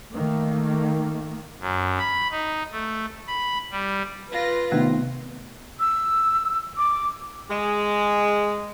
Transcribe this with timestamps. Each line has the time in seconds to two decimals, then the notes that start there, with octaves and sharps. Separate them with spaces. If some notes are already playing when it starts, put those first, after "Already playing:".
0.13 D#3 A3 A#3
1.60 F#2
1.99 B5
2.31 D#4
2.72 A3
3.27 B5
3.70 G3
4.32 F4 B4 A#6
4.72 C3 D#3 A3 B3 C4
5.80 E6
6.78 D6
7.49 G#3